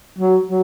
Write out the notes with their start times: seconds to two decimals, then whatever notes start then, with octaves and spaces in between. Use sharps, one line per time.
0.19 F#3
0.48 F#3